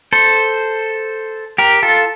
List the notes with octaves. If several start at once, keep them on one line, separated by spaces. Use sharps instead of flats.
A4 C5
G4 A#4
F4 A4